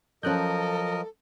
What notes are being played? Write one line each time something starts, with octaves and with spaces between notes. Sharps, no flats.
F3 F#3 C#4 A4 A#4 D#5 F#6 G6